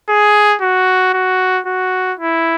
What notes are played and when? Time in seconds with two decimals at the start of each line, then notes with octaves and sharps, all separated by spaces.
0.09 G#4
0.62 F#4
1.13 F#4
1.66 F#4
2.19 E4